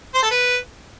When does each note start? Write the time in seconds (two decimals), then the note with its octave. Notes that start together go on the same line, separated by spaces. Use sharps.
0.14 C5
0.23 A4
0.31 B4